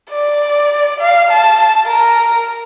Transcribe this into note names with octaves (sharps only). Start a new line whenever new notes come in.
D5
F5
A5
A#4